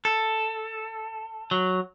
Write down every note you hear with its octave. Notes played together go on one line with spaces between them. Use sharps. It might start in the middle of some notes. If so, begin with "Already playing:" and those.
A4
F#3